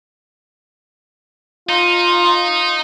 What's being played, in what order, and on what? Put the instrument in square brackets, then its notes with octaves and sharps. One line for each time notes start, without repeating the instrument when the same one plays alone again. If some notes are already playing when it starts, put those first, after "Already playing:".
[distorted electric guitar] D#4 [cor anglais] F4